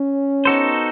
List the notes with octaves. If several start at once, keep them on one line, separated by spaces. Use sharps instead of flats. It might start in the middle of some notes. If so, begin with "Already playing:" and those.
Already playing: C#4
B3 D#4 F#4 A4 C5